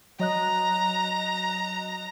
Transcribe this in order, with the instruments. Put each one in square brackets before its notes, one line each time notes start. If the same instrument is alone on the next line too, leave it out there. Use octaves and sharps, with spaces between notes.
[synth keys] F#3 D#5 F#6 [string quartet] A#5